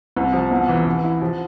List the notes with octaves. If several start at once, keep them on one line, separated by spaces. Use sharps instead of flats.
C2
F3
E2
E3
E3
E4
F3